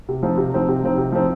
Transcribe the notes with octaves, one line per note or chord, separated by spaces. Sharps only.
C3
F3 C4 D#4
C3
F3 C4 D#4
C3
F3 C4 D#4
C3
F3 C4 D#4